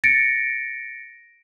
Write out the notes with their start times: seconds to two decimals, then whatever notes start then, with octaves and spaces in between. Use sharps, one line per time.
0.04 A6 A#6 C#7 D7